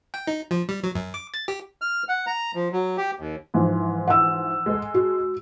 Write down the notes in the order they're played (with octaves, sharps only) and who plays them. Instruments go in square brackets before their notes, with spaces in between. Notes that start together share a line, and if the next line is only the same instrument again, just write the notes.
[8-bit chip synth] G5
D#4
F3
G3
F#3
F#2
D6
A6
G4
[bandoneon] F6
F#5
A#5
F3
F#3
G4
D#2
[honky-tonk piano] G#2 E3 F3
[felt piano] F#5 E6
[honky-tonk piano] G#3 A4
[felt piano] F#4